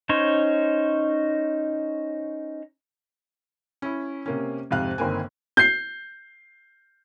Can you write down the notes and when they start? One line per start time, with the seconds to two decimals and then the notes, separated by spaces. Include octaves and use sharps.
0.09 C#4 D#4 C5 C#5
3.82 C#4 E4
4.26 C3 A#3 C#4
4.71 F2 G#2 C3 F5 F#6
4.98 G1 D#3 A#3 C4 G#5
5.57 G6 C7